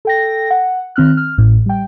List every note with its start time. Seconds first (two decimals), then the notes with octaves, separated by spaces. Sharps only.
0.05 A4 G5 A#6
0.50 F#5
0.96 D#3 C4 F6 F#6
1.17 F6
1.38 A1 A2
1.66 G3 G5